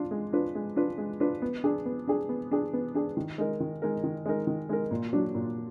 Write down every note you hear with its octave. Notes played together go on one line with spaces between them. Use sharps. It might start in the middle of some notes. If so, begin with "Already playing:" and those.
Already playing: D4 F4
G#3
D4 F4 B4
G#3
D4 F4 B4
G#3
D4 F4 B4
B3
D4 G#4
B3
D4 G#4
B3
D4 G#4
B3
D4 G#4
D#3
G#3 D#4 A#4
D#3
G#3 D#4 A#4
D#3
G#3 D#4 A#4
D#3
G#3 D#4 A#4
A#2
F#3 D4
A#2